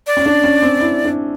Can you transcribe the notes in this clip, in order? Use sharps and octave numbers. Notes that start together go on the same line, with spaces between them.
D5
C#4
D4
C#4
C4
E4
D4